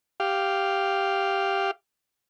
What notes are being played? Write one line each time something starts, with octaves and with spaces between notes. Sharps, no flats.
G4 F5